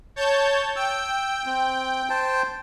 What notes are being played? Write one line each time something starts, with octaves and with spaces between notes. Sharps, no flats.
C#5 A5 G6
G5 E6
C4
C5 G5 A5